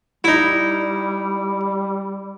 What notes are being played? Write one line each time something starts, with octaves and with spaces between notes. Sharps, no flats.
G3 D#4 E4